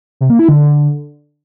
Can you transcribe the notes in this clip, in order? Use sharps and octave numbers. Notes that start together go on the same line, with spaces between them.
C3
A#3
E4
D3